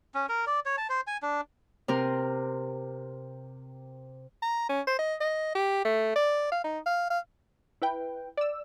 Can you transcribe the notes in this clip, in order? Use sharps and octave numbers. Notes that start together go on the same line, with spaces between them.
C#4
A#4
D5
C#5
A5
C5
G#5
D4
C3 C4 A#4
A#5
C#4
C5
D#5
D#5
G4
A3
D5
F5
D#4
F5
F5
E4 B4 G5
D5 E6